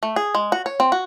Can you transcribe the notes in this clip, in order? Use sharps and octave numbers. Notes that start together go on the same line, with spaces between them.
A3
G#4
G#3
F#4
C#5
C4
F#4